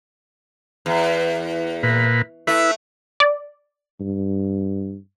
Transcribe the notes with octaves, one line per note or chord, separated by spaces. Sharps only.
E2
A#2 B4
A3 E4 B4
D5
G2